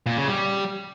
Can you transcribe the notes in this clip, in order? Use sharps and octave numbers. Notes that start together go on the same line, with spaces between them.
A#2
C#3
G3